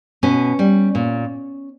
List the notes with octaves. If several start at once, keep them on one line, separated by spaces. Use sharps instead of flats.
B2 C#4
G3
A#2